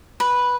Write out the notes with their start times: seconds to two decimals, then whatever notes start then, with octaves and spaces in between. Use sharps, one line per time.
0.20 B4